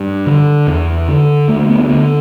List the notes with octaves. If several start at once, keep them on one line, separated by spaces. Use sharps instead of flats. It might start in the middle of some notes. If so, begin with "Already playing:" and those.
Already playing: G2
D3
E2
D3
D2 A3
A3
B3
D3 B3